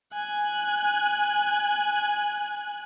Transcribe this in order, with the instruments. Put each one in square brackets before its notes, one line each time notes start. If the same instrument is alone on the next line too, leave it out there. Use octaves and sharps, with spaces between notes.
[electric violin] G#5 F#6